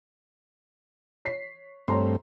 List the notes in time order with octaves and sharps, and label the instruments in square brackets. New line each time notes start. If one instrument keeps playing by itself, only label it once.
[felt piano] C#5 B6 C7
[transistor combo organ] G2 A3 C4 [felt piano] C#5 A#5 C6